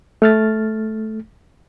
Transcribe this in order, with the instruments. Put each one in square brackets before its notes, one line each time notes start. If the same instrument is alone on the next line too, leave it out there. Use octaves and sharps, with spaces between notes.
[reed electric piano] A3 F6 A6